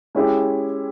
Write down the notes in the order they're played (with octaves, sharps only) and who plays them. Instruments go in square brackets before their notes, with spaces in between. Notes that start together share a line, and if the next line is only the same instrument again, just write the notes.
[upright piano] G#3 C#4 E4 G4